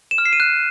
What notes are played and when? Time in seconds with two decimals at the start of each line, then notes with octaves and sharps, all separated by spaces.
0.11 E7
0.18 F6
0.25 C7
0.33 D#7
0.40 F#6